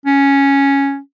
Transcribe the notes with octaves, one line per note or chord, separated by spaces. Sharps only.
C#4